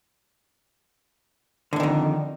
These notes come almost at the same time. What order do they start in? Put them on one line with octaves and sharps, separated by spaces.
D3 A2 D#3 F2